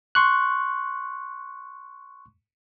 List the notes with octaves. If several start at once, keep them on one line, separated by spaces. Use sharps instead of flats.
C6 C#6 F#6